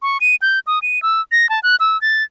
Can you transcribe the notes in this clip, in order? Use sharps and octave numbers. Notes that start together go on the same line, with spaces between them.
C#6
D#7
G6
D#6
D#7
E6
A#6
A5
F#6
E6
A6